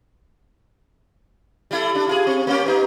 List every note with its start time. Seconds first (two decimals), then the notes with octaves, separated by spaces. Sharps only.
1.71 G3 E4 A4
1.95 D4
2.07 F4 F#4 G#4
2.27 C4
2.47 A#3 C#4 G4
2.66 B3 D#4